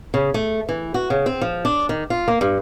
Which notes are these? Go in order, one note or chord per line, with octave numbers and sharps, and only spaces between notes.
C#3
A3
E3
F#4
C#3
C4
F3
D4
D#3
F4
A#3
G2